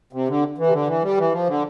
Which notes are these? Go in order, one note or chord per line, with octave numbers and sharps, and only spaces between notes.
C3
D3
E3
C3
D3
E3
G3
E3
F3
D3